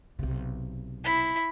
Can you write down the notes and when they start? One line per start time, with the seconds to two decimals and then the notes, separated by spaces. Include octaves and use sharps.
0.19 B1 C3
1.04 E4 B5